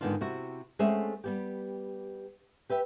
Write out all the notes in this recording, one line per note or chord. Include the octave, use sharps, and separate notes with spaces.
G#2 D3 D#3 B3 D4 F4
C3 E4 F#4
G#3 A3 C4 C#4 E5 F#5
G3 B3 G4
G4 B4 E5 G5